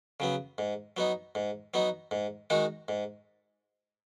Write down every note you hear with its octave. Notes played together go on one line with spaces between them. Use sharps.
C#3 F#3 B3
G#2
F#3 B3 D#4
G#2
F#3 B3 D#4
G#2
D#3 G#3 D#4 F#4
G#2